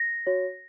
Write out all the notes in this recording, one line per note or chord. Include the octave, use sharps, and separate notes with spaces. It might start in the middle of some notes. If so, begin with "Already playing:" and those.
Already playing: A#6
F#4 C#5